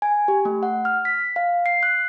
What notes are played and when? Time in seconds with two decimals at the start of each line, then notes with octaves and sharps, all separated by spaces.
0.02 G#5
0.28 G4
0.45 A3
0.63 F#5
0.85 F6
1.05 B6
1.36 F5
1.66 C7
1.83 F#6